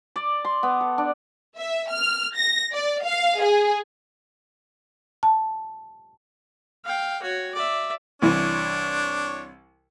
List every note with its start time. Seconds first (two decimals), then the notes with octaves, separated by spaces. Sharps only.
0.16 D5
0.45 C6
0.63 B3
0.80 A4
0.98 D4
1.58 E5
1.91 F6
2.37 A#6
2.73 D5
3.04 F5
3.42 G#4
5.23 A5
6.85 F5 G5
7.22 F#4 C#5
7.54 D5 E5
8.22 C2 E3 D4 C#5